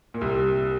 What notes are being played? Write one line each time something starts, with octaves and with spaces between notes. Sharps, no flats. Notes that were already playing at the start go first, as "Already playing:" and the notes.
A#2
C2 C3